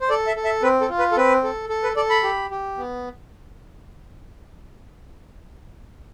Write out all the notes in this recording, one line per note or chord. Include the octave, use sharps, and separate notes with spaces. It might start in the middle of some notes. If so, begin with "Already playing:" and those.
C5
A4 D5
E5
A4
E5
C4 B4
A4
F4
B4
A4
C4 B4
A4
A4
B4
A4 D5
B5
G4
G4
B3